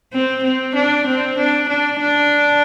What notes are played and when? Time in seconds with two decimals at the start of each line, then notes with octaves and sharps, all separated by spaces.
0.13 C4
0.44 C4
0.75 D4
1.07 C4
1.38 D4
1.69 D4
2.01 D4